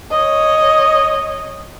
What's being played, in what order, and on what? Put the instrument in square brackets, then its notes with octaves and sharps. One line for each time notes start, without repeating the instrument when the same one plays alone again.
[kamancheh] C#5 D#5